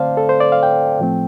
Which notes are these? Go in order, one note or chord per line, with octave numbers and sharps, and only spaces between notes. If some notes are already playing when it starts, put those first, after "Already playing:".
Already playing: D3 A3 C4 C5 D5 F5 A5
A4
C5
D5
F5
G5
A2 F3 A3 C4